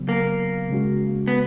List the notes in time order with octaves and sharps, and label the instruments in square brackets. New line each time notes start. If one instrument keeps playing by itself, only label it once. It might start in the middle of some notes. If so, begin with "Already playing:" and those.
Already playing: [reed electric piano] C#3 F#3 B3
[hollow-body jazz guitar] A#3
[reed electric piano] C#3 G#3 C#4 F#4
[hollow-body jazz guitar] B3